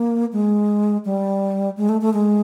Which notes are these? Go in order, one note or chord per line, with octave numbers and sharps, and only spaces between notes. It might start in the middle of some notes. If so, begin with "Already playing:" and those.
Already playing: A#3
G#3
G3
G#3
A3
A3
G#3